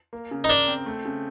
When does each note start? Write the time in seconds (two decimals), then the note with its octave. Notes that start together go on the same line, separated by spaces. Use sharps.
0.13 A#3
0.31 C#3
0.44 D#4
0.49 D4 A#4
0.68 C4
0.86 A3
1.05 C#3